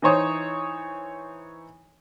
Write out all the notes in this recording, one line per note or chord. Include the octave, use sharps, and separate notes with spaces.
E3 D#4 C5 C#5 D#6